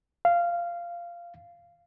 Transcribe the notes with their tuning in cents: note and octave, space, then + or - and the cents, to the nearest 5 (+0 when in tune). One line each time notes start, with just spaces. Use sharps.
F5 -15